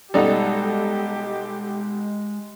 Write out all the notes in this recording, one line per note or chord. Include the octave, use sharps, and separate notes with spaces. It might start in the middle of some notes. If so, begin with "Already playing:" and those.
B1 G3 G#3 D#4 G4 A4 D5